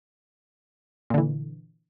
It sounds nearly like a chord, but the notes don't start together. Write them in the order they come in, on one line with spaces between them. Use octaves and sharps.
A#2 D3 E3